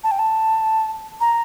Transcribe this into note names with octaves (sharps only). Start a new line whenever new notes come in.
A5
G5
A5
A#5